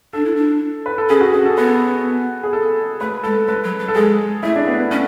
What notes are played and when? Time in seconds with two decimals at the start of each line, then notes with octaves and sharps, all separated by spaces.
0.13 D4 A4
0.25 E4
0.36 D4
0.86 B4
0.98 A4
1.09 C#4 G#4
1.21 F#4
1.33 C#4 G#4
1.45 A4
1.58 B3 B4
2.43 G#4
2.53 A4
3.00 A3 B4
3.23 G#3 A4
3.48 G#3 B4
3.64 F#3
3.80 F#3
3.88 A4
3.95 G#3 G#4
4.43 A3 E4
4.56 D4
4.67 B3
4.79 B3
4.91 A3 C#4